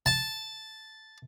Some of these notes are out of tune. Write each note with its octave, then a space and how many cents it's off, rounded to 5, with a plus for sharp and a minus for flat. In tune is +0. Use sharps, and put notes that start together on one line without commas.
A5 -5